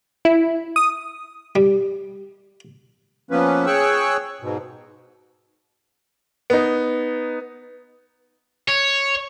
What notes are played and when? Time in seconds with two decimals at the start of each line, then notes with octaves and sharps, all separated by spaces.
0.25 E4
0.76 D#6
1.56 G3
3.31 F3 A#3 B3 C#4 B4
3.66 G#4 C#5 G5 C#6 E6 F#6
4.42 G#2 B2
6.50 B3 D#4
8.69 C#5